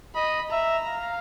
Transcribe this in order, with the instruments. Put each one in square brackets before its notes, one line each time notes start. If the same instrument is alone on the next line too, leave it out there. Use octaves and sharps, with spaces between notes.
[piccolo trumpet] D#5 [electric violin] B5
[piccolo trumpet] E5 [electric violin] A#5
[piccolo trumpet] F5